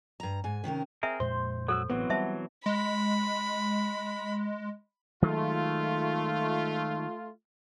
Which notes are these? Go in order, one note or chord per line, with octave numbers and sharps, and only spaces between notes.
G2 A#5
G#2 G#5
C3 D#3 C#4 A#4
C4 G#4 A#4 E5
F2 A#2 G#3 C5 C6
F#3 F#4 A4 E6
A1 E3 F#3 B3 C4
G3 C5 E5 A5
G#3 B5
D#3 F#3 G#3 A3 F4